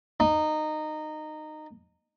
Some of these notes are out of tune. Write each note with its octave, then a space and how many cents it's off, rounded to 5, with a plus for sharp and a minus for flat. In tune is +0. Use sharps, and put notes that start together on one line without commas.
D#4 -15